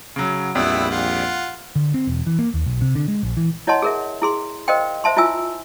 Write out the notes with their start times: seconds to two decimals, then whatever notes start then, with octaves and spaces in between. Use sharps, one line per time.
0.16 C#3 F#3
0.55 A#1 F2 G3 B3 E4 E5
0.91 F4 F#5
1.76 D3
1.94 C4
2.07 E1
2.27 E3
2.39 A#3
2.54 D#2
2.66 B1
2.81 C3
2.95 D3
3.08 G#3
3.23 A#1
3.37 E3
3.67 E4 C#5 D#5 F#5 A5 C6
3.82 G#4 A#4 E5
4.22 E4 G#4 C6
4.68 A#4 C5 D#5 F5 G5 C6
5.04 C5 E5 A5 C6
5.17 E4 F4 E5 G#5 E6